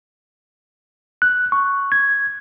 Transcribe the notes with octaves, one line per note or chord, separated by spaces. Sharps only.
F#6
C#6
G#6